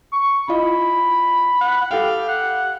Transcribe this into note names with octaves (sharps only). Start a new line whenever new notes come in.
C#6
E4 F4 D#5 B5
F#5
G4 A4 F5 G5
F#5